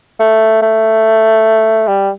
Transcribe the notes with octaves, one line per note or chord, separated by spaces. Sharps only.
A3
A3
G3